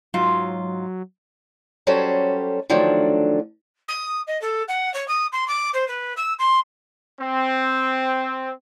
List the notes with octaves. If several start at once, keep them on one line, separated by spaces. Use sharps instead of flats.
G#2 F#3 F4
F#3 G3 C#4 A4 C5
D3 D#3 F3 F#3 A3 D4
D#6
D#5
A4
F#5
C#5
D#6
C6
D6
C5
B4
E6
C6
C4